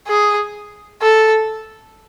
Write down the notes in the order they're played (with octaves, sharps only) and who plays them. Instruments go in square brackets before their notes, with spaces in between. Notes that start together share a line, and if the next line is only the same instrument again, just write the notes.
[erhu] G#4
A4